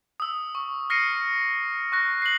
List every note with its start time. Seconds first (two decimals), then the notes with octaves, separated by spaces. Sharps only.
0.20 D#6 E6
0.55 C#6
0.90 F6 A#6 C7 C#7 D#7
1.92 C#6 F#6 A#6
2.22 C7 F#7